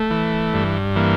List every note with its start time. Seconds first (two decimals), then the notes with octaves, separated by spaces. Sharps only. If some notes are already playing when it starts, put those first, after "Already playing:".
Already playing: A3
0.10 E3
0.54 G2
0.96 E3 A#3